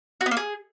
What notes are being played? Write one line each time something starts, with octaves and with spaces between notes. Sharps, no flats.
F#4
B3
A#3
G#4